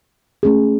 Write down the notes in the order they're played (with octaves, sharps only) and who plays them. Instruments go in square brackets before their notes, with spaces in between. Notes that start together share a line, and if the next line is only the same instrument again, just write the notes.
[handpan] A3 C#4 G#4